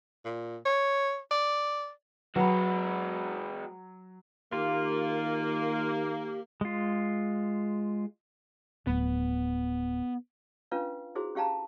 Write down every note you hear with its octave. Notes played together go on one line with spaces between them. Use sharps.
A#2
C#5
D5
F#3 G#3 F#4 B4 B5
D#3 A#3 F4 G4
G#3 F4
D1 B3
C#4 D4 F4 B4 F5
E4 F#4 G#4 C5
C#4 G4 F5 A5 A#5